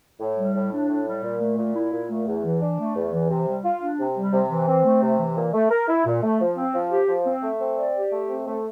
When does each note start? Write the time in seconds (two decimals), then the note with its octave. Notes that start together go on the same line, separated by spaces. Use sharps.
0.20 A2
0.38 G3
0.55 A2
0.72 D4
0.89 A2
1.07 G3
1.23 A#2
1.41 A3
1.58 A#2
1.76 E4
1.92 A#2
2.10 A3
2.27 E2
2.44 E3
2.61 D4
2.79 A3
2.96 E2
3.13 E3
3.30 C3
3.47 G3
3.64 F4
3.82 D4
4.00 C3
4.16 G3
4.33 C3
4.50 E3
4.68 C4
4.85 A3
5.02 C3
5.20 E3
5.36 A#2
5.54 A3
5.71 A#4
5.88 E4
6.06 A#2
6.23 A3
6.40 F3
6.57 C4
6.74 F3
6.91 G4
7.09 F3
7.26 C4
7.43 A3
7.60 C4
7.77 D5
7.95 G4
8.12 A3
8.29 C4
8.46 A3